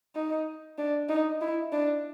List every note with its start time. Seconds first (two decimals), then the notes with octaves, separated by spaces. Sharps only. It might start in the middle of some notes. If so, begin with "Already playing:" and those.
0.15 D#4
0.78 D4
1.09 D#4
1.41 E4
1.72 D4